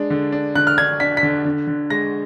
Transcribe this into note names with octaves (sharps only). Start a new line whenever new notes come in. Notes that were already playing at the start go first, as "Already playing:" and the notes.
Already playing: G#3 D4
D3
D4
D3 F#6
F6
D4 G#6
D4 B6
B6
D3
D3
D3
G#3 A#6